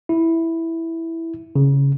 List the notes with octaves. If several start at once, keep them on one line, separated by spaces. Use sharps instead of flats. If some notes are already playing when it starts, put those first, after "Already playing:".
E4
C#3